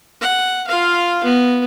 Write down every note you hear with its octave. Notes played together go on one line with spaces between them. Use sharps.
F#5
F4 F5
B3